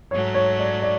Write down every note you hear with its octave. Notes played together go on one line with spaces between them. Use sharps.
G#2 F#3 A3 C#5
C#5
D5
D5